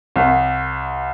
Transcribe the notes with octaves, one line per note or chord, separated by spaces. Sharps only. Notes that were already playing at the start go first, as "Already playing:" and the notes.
C2